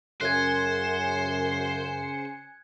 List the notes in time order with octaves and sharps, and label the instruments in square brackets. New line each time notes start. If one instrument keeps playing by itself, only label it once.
[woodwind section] F#2 [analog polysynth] C#3 G#5 C#7 [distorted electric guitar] C5 [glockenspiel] F#6 G#6